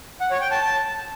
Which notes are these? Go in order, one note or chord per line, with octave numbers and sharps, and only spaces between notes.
F#5
C#5
G5
A5
A5